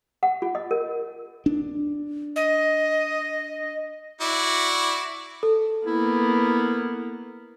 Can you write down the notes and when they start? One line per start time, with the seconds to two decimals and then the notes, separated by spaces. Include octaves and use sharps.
0.23 F#5
0.42 F4
0.55 D#5
0.71 A#4
1.46 D4
2.36 D#5
4.21 E4 F#4 D5
5.43 A4
5.86 A#3 B3 E4